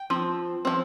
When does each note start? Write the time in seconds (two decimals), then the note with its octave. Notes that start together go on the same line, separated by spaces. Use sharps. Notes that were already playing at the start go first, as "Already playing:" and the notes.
Already playing: G5
0.10 F3 C4
0.65 F3 C4